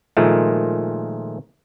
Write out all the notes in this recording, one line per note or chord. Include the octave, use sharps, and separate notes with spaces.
A#2 D#3 F3 G#3 A3